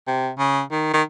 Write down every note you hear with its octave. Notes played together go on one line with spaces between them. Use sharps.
C3
C#3
D#3
D#3